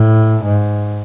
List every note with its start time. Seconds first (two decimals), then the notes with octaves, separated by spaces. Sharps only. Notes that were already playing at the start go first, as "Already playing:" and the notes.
Already playing: A2
0.44 G#2